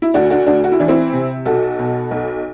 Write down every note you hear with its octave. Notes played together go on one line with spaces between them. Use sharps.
E4
D2 D4 F#4
D4 F#4
D2 D4 F#4
F#4
E4
E3 D4
C4 E4
C3
B1 F#4 A4
B2
B1